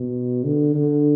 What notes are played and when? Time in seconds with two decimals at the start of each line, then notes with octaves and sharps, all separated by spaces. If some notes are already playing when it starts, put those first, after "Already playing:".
Already playing: B2
0.44 D3
0.75 D3